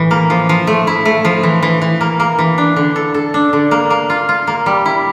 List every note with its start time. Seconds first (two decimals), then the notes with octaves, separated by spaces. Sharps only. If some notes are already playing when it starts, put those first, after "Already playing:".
Already playing: A2 E3
0.11 A#3
0.30 F3
0.49 F3
0.67 A3
0.87 E4
1.05 A3
1.25 F3
1.43 E3
1.63 E3
1.82 E3
2.01 A#3
2.20 A#3
2.39 E3
2.58 D4
2.76 D3
2.96 A4
3.14 A4
3.34 D4
3.53 D3
3.71 A#3
3.90 A#3
4.10 F4
4.29 F4
4.47 A#3
4.66 G3
4.86 E4